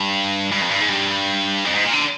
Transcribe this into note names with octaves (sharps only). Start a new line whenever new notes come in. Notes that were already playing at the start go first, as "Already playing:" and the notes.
Already playing: G2
G2
F2
G2
G#2
G2
F2
G#2
A#2
D3